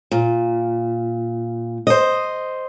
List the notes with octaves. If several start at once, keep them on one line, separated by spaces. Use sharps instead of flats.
A#2
C5 D#5